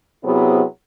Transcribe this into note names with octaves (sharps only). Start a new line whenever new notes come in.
C3 F#3 B3 E4 G#4 C5